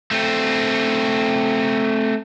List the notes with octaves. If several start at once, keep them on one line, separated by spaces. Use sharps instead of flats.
A3 C4